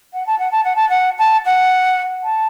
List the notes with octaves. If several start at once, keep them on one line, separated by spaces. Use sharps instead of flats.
F#5
A5
F#5
A5
F#5
A5
F#5
A5
F#5
A5